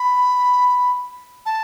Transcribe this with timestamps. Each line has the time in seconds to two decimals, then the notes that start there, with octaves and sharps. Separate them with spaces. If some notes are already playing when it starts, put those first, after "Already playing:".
Already playing: B5
1.46 A5